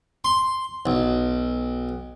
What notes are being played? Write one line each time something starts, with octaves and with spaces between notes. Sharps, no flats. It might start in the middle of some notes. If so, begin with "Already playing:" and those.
C6
B1